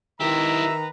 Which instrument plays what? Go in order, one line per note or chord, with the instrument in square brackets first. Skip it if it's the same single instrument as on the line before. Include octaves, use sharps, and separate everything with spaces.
[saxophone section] D#3 [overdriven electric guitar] E4 G4 [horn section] B4 A#5 [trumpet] E5